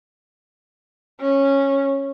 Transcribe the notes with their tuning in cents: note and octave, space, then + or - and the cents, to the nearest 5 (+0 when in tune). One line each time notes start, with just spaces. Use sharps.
C#4 -10